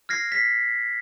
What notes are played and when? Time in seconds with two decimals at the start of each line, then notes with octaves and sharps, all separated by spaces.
0.09 F6 G#6 A#6 C7
0.32 B6 C7